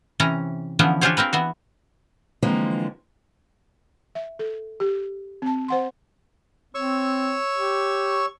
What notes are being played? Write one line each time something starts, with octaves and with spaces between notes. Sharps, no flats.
C3 E3 C#4 A#5
D3 E3 F3 B3 C#4
D4 F4 G4 G#4 C5 C#5
A#3 C4 A#4 B4
E3 B3 F#4
D3 E3 F3 G#3 A#3 C4
E5
A4
G4
C4 A5
C5 F#5 C6
C4 C#5 C#6 E6
G4